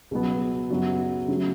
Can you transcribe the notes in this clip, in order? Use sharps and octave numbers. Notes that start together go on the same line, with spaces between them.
C#2 B2 F#3 B3
F#2 C#3 F#3 B3 F#4
C#3 F#3 A3